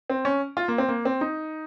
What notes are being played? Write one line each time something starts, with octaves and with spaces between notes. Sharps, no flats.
C4
C#4
F4
A#3
C4
A#3
C4
D#4